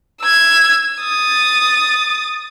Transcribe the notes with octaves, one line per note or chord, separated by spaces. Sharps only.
E6 G#6
D#6 A6